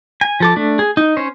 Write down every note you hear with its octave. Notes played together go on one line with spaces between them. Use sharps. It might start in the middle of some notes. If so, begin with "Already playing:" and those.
G#5
F3 A4 D6
A3 D4
G#4
D#4
C#4 C5 C#5